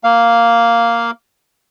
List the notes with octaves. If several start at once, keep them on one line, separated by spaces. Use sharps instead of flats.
A#3 F5